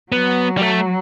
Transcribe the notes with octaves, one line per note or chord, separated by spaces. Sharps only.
F#3 B3
G3
A3